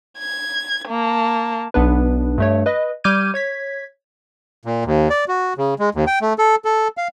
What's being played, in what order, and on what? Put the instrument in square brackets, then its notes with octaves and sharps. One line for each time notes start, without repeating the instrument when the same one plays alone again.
[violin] G#6
A#3 A5
[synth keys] B1 B3 D4 B4
G2 A3 C#5
B4 D#5
G3 D6 F6 G6 G#6 D#7
C#5 G#6 B6
[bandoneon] A#2
D#2
D5
F#4
C#3
G#3
D#2
G5
A3
A4
A4
F5